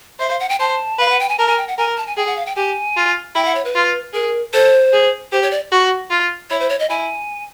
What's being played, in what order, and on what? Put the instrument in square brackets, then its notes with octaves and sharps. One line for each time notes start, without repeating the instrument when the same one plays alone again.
[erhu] C5 [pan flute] E5
[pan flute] F5
F#5
G5
[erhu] C5 [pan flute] A5
[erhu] B4 [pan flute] F5
[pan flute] F#5
G5
G#5
[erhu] A#4 [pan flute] A5
[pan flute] G#5
G5
F#5
[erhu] A#4 [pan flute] G#5
[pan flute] A5
G#5
[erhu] G#4 [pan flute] G5
[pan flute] F#5
F5
G5
[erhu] G4 [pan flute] G#5
[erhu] F4
[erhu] E4 [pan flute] G5
[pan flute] F#5
C#5
B4
[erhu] F4
[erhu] G#4 [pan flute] A#4
[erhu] A4 [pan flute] C5
[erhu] G#4
[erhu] G4 [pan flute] C5
[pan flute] C#5
D5
[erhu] F#4
F4
[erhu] E4 [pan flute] C#5
[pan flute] C5
C#5
D#5
[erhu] E4 [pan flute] G#5